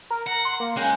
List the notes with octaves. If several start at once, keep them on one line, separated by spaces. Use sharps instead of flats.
A#4
F#5 A#5
C6
A#3
C#3 G#3 G5 F#6